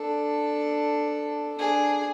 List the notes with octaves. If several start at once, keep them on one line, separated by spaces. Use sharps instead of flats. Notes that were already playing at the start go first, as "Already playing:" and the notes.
Already playing: D4 A4
D4 G#4